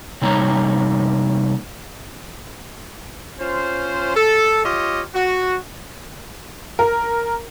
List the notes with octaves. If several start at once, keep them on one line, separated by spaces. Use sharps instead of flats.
C3 G3 A#3 D#4 C#5 A#5
C#4 F4 C5
A4
F4 G4 C#5 D#5
F#4
A#4